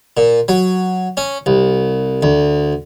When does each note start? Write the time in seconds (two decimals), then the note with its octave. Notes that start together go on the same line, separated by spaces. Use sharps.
0.17 A#2
0.48 F#3
1.17 C#4
1.46 C2
2.23 D2